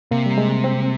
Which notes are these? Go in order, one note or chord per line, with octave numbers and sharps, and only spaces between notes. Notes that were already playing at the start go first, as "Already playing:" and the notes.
C3 A#3
G3
G#3
C4